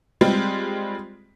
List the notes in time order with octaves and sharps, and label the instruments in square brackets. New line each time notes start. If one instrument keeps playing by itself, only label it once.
[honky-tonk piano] G3 G#3 C4 F4